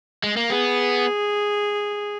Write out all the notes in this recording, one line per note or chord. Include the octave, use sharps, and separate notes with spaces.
G#3
A#3
B3 G#4